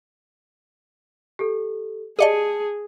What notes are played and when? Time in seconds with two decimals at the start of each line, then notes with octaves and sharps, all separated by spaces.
1.39 G4 A4
2.19 G4 G#4 D5 D#5 A5 C#7 D#7